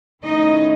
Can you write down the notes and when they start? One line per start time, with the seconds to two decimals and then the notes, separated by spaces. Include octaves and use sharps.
0.22 D#3 A3 C#4 D#4 E4 D#5